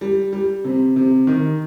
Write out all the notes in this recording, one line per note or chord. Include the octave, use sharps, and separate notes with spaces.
G3
G3
C3
C3
D#3